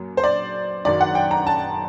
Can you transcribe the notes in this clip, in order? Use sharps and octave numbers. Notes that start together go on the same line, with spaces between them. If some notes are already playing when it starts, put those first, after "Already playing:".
Already playing: F#2 F#3 A#3
C5
D5
F#1 F#2 D#3 F#3 D5
F#5
G5
A#5
A5